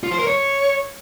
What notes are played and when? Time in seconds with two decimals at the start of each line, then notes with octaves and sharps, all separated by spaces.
0.03 F4
0.11 C5
0.19 A#4
0.27 C#5